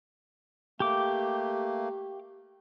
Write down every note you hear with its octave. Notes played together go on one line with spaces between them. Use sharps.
A3 A#3 G4 D6